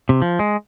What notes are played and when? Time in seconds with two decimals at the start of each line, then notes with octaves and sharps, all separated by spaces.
0.09 C3
0.22 F3
0.39 G#3